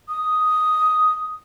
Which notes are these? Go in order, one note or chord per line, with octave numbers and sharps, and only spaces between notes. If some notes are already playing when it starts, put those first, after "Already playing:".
D#6